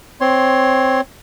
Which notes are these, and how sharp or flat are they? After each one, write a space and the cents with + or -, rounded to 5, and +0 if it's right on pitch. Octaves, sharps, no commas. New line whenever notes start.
C4 +0 C#5 +0 C6 +15